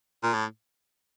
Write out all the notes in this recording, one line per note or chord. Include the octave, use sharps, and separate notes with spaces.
A#2
A2